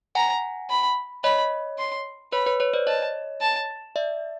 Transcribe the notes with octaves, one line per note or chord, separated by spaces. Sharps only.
F#5 G#5 A#5
B5
C#5 D#5 B5
C6
B4 C#5 B5
B4 C#5
B4 C#5
C5 D5
C#5 D#5 A5
A5
D5 E5